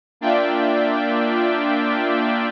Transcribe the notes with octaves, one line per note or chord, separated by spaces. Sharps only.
A#3 D4 F4 D5 E5 G5